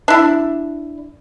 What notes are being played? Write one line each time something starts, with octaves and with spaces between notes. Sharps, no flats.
D4 E4